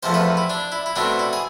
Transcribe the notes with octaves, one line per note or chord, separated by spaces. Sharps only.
E2 C3 F3 A3 C5
B4
E4
D4
E4
E4
B2 A3 C4 D4
E4
G#4